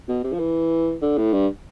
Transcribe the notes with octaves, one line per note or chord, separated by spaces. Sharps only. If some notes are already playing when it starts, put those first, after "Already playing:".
B2
C3
F3
E3
D3
A2
G2